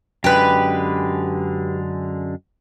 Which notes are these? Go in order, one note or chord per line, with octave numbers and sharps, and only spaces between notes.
F#2 D3 G#3 G4 B4